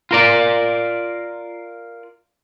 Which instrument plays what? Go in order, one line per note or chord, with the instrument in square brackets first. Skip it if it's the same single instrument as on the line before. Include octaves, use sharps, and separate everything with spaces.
[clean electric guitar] F4 A#4 D5